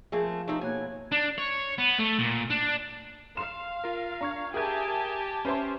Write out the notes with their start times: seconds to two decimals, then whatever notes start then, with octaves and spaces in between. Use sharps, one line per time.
0.12 F3 A3 A#3 C4 G#4
0.48 A3 C4 D#4 G4 A#4
0.61 B2 A#3 C#5 G#5 F#6
1.12 D4
1.38 C#5
1.78 B3
1.99 A3
2.19 A#2
2.50 D4
3.37 F5 C6 C7 E7
3.84 F4 A#4
4.21 D4 A#5 C#6 G#6
4.54 G4 G#4 A#4 E5 G#5 A5 G#6
5.45 C#4 B4 C5 E5 C6